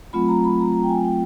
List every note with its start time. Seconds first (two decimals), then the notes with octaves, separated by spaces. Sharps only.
0.13 F#3 A3 C4 F4 B5
0.28 A#5
0.44 B5
0.59 A#5
0.74 A#5
0.83 G5
0.89 G#5
1.05 G5